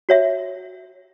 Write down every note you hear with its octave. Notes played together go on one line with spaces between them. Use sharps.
F#4 C#5 E5